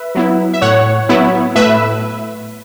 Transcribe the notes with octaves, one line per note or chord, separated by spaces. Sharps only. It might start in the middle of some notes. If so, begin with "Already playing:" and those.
Already playing: B4 E5
F#3 B3 E4
E5
A2 C#5 F#5
F#3 B3 E4
A2 B4 E5